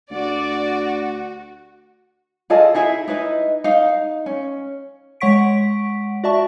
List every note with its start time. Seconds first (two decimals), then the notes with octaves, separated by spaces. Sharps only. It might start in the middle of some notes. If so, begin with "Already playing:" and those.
0.11 D2 F#4 D5
2.50 F4 G#4 A4 D#5
2.74 D#4 E4 G#4 E5
3.08 D#4 E4 B4 D#5
3.64 D#4 F5
4.26 C#4
5.21 G#3 C#5 F#5 C#6 B6 D7
6.24 F#4 D5 E5 A5 C#6